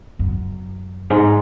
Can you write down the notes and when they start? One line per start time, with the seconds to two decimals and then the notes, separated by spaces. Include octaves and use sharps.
0.19 F#2
1.10 G#2